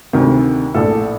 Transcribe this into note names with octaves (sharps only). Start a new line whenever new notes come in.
D2 C3 D#3
A#1 A2 A4